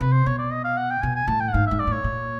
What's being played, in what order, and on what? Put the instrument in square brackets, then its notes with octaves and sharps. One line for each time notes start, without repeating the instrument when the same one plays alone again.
[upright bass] C3 [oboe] B4
[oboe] C5
[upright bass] B2 [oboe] C#5
[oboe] D5
D#5
F5
F#5
G5
[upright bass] B2 [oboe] G#5
[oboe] G#5
[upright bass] A2 [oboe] A5
[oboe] G5
F#5
[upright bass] G#2 [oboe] F5
[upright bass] G#2 [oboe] E5
[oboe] D5
[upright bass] A2
[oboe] C#5
[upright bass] A#2